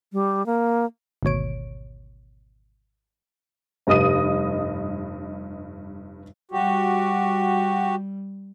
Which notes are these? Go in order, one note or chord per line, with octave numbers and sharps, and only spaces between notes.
G3
A#3
G#1 D2 B2 C#5 D7
F1 G2 D#5 D#6 D#7
G3 F#4 G4